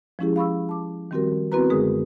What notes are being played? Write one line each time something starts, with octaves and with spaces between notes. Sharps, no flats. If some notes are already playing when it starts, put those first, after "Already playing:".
F3 G#3 C#4 E4 G4 G#4
F5 B5 C#6 E6
A5 D6
D#3 G3 C4 F#4 G4 A#4
B3 C4 E4 F#4 B4 A#5
F#2 D3 G#3 G#4 A#4 D#6